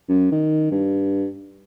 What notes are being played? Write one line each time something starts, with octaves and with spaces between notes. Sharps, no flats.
F#2
D#3
G2